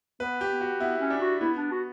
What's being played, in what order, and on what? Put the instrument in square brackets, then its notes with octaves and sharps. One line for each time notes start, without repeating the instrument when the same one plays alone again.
[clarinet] B3 [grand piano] B4
[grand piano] G4
[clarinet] B3
[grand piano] F#4
[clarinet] B3 [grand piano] E4
[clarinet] C#4
[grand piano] D4
[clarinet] F#4
[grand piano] B3 [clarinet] E4
[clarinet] D4
F#4